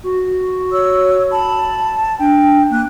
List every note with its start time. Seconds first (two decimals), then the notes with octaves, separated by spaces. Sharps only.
0.03 F#4
0.71 C#5 E6
1.31 A5 B5
2.19 D4 G5
2.70 A#3 F#6